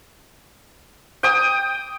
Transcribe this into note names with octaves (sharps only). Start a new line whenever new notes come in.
G5 D#6